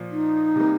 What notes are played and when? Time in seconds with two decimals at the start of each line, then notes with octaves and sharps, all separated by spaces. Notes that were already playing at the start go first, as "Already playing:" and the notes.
Already playing: A#2 F3
0.11 D#4
0.56 C3 G3 A#3